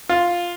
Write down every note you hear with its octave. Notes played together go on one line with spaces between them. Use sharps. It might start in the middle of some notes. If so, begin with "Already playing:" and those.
F4